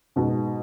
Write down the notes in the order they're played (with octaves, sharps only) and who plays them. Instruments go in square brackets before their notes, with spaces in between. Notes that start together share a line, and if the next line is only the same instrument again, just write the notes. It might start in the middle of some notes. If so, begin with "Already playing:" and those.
[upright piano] G#2 B2